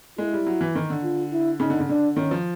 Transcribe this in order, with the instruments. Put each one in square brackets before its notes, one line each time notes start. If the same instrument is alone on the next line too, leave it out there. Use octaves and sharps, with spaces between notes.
[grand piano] G#3 [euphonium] E4
[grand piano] G3
F#3
E3
D#3
D3
[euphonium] F4
E4
[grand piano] C#3 [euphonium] D#4
[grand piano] D3
C#3
[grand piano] D3 [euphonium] D4
[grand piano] D#3 [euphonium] C#4
[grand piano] F3